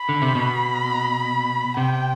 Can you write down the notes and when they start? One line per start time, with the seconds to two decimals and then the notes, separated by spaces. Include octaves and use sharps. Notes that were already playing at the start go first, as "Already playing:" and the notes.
Already playing: B5
0.09 D3
0.22 C3
0.35 B2
1.77 C3 G5